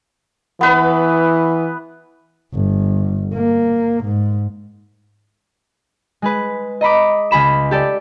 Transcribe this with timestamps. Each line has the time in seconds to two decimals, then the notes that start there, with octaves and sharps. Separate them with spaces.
0.61 E3 B3 B4 B5
2.54 G1
3.34 A#3
4.04 G#2
6.22 G#3 G#4 B4
6.81 D#5 A#5 B5 D6
7.31 C#2 G#4 B5 E7
7.71 G4 A4 D5